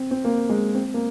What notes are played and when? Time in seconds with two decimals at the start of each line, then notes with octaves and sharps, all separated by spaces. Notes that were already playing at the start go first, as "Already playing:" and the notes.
Already playing: C4
0.11 C4
0.25 A#3
0.49 G#3
0.75 C4
0.94 A#3